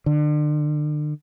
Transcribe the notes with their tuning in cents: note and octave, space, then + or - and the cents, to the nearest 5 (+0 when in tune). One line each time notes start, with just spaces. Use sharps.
D3 +35